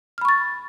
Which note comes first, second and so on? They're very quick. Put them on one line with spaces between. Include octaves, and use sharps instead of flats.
F6 B5 C#6 A6